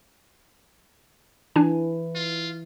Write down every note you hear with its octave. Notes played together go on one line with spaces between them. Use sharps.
E3 D4 G#5
F4